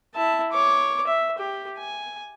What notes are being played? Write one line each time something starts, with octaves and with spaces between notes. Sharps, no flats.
E4 A5
C#5 D6
E5
G4
G#5